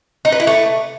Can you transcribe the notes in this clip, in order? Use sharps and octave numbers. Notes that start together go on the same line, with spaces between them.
D#4
B4
E4
A3